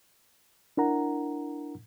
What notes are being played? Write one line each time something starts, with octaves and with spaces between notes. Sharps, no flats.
D4 E4 A#4 F#5 A#5